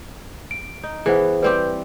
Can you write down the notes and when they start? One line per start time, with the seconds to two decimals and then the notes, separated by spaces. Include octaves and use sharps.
0.51 D7
0.83 D#4
1.06 E3 B3 G#4 C5 F#5
1.42 G3 C4 G4 B4